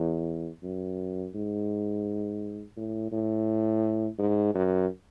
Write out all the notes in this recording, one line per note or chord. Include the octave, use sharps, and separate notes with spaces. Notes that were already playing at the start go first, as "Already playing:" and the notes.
Already playing: E2
F#2
G#2
A2
A2
G#2
F#2